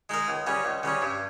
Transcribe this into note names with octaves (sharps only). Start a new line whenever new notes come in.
G#3 D#4 A#4
C#2
C#3 G3 C#4
C#2
C#3 G3 C#4
G2